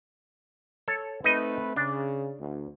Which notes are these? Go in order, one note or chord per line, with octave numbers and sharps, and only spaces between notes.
A4 C#5
A3 C4 D#4 B4 D#5
C#3 D4
D2